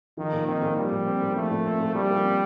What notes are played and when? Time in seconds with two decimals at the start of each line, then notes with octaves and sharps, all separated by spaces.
0.17 D#3 F3
0.33 A#2
0.47 D#3 C4
0.62 A#2
0.77 F3 G3
0.92 A#2
1.07 C4
1.22 A#2
1.36 F3 A3
1.51 A#2
1.66 C4
1.80 A#2
1.95 F3 G3
2.10 A#2
2.25 C4